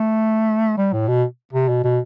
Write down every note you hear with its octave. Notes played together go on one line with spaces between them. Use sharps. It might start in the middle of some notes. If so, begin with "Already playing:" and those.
Already playing: A3
G3
A2
B2
C3
B2
B2